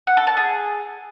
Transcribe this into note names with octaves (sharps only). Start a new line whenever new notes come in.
F#5
A4
A5
G#4